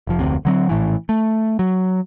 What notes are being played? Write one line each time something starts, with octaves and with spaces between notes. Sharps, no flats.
F1 F3
F1 D2 C3
D3 F#3 C4
A#1 A2 E3
A3
F#3